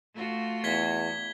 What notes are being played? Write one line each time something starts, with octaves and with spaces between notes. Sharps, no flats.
A3 F4 F#4
E2 G#6 B6 G7